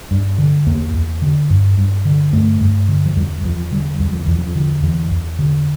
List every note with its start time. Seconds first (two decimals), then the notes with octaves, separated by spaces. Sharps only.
0.11 G2
0.38 D3
0.66 E2 A#3
0.94 E2
1.22 D3
1.50 G2
1.78 G2
2.05 D3
2.33 G2 A3
2.61 G2
2.88 D3
3.05 F3
3.16 E2 G3
3.44 E2 F3
3.72 D3 G3
4.00 E2 G3
4.12 F3
4.26 E2 E3
4.38 F3
4.55 D3
4.83 E2 E3
5.11 E2
5.39 D3